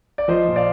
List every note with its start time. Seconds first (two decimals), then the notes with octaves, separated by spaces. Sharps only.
0.18 D5
0.28 F3 C5 D#5
0.48 A#2
0.56 D5 F5